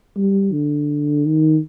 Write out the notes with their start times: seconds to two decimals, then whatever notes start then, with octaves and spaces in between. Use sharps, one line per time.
0.16 G3
0.52 D3
1.26 D#3